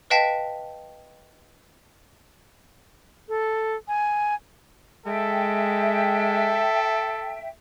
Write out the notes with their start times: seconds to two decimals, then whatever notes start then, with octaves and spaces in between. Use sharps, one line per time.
0.10 B4 D#5 F5 G5 A5 B6
3.29 A4
3.88 G#5
5.06 G#3 A4 E5 G5